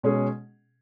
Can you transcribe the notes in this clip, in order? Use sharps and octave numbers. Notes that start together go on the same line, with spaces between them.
B2 G#3 C#4 G#4